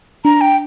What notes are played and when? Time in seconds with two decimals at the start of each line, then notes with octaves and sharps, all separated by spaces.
0.25 D4 A#5
0.41 G5